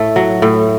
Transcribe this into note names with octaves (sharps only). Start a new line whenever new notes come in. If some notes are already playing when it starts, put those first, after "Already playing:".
Already playing: A2 A3
F#3
A2